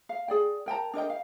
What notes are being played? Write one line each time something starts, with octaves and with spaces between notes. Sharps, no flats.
F5
G#4 D5 G5
A#4 G5 A5 A#5
D4 A#4 D#5 G5
F5